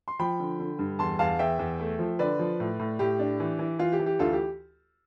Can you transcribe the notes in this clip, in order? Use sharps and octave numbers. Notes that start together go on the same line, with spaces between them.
C6
F3 G5 B5
D3
D3
G2
E2 A5 C6
E2 F5 A5
E2 E5 G5
E2
A3
F3
D3 B4 D5
F3
A2
A2
A2 G4
D4
E3
E3
E3 F4
G4
E3
G4
D2 F4 A4
G4